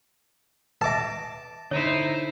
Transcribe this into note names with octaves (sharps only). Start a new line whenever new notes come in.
B4 E5 A5 D6
D3 D#4 E4 C5 C#5